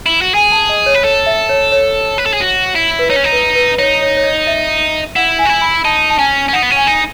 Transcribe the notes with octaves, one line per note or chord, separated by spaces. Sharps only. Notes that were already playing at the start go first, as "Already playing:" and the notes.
E4
F#4
G#4 G#5
A5
D#5
C#5
B4
A4 C#5
E5
C#5
C#5
B4
A4
G#4
F#4
E4
B4
D#4 C#5
C#4
D#4
B4
B4
D#4 C#5
C#5
C#5
D#5
E5
E4 F#5
G#5
F#4
E4
B5
D#4 A5
A5
C#4 G#5
C#4
D#4 F#5
B3
C#4
G#5
D#4